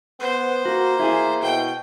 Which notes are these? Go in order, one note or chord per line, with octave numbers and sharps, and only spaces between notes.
B3 C5
A#3 F#4
E4 G#4 G#5
B2 G5